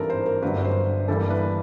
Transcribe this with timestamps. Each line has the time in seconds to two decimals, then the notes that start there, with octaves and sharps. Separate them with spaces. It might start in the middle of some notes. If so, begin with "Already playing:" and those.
Already playing: G#1 G2 E3 A4 A#4
0.10 C5
0.26 A#4
0.42 G1 G2 D3 F#3 B4
0.64 C5
1.08 G1 G2 E3 G3 A#3 A4
1.30 B4